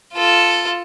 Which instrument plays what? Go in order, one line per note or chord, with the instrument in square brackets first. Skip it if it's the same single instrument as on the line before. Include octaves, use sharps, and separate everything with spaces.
[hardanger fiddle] F4 A4